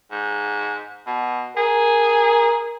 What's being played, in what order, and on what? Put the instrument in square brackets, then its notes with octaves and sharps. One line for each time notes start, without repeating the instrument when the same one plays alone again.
[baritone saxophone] G#2
B2
[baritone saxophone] G#4 [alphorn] A#4